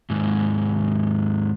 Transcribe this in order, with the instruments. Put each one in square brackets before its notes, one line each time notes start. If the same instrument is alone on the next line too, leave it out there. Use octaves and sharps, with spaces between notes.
[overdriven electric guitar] D#2 G#2